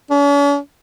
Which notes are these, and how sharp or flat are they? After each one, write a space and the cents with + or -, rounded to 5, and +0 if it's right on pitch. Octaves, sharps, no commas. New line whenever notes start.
C#4 +45